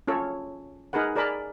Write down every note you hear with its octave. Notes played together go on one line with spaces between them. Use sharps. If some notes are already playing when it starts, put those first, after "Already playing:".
C#4 F4 A4 C#5
D#4 G#4 A#4 B4 F#5
G#4 A#4 D5 A5 B5